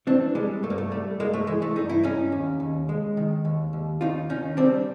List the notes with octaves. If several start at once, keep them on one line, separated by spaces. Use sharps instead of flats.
E3 C4 D4
G3 G#3
G2 A3
A#3
A3
G3 A3
G2 G#3 A#3
A3
E3 G#3
A3
G2 D#4
E4
G2 C#4 D#4
D#2
D#2
G#3
D#3
D#2
D#2
D#2 D#4 F4
D#3 C#4 D#4
G3 C4 D4